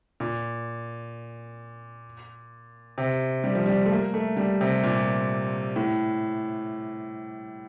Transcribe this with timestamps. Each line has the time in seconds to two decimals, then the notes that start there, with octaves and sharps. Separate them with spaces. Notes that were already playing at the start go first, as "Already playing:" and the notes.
0.20 A#2
2.98 C3
3.44 G3
3.55 F3
3.66 G3
3.85 A3
3.91 A#3
4.14 A3
4.37 G3
4.61 C3
4.83 A#2
5.76 A2